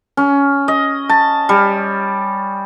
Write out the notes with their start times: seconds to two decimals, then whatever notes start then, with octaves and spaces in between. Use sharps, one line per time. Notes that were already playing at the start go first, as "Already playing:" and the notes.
0.17 C#4
0.68 D#5
1.09 A5
1.49 G3